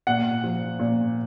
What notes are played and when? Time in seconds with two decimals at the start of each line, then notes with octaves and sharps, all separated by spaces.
0.07 A#2 F#5
0.43 F3
0.79 A#2